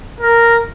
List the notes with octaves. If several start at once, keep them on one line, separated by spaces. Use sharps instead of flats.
A#4